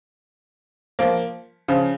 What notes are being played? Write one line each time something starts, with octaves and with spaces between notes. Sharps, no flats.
F3 A#3
C#3 F3